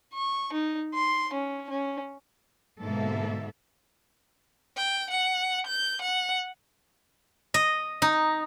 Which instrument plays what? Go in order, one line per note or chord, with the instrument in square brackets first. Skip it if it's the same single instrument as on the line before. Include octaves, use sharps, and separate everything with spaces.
[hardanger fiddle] C#6
D#4
C6
C#4
C#4
[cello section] G#2 B2 D3 A#3 A4 E5
[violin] G5
F#5
G6
F#5
[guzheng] D#5
D#4